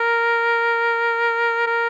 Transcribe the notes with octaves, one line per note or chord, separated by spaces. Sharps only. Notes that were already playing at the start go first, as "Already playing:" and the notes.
Already playing: A#4
A#4